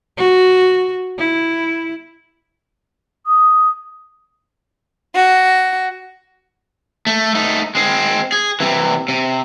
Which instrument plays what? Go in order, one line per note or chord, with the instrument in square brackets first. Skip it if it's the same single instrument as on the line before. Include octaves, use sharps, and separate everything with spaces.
[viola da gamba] F#4
E4
[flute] D#6
[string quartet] F#4
[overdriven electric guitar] A3
A3 D#4
G#3 C4
G#4
C3 E3
C3